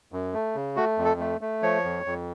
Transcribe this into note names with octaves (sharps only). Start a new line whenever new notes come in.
F#2
A3
C#3
A3 F#4
F2
A4
A3
A3
F3 C#5
F2
F2